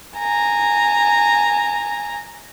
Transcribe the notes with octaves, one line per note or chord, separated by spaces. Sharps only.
G#5 A#5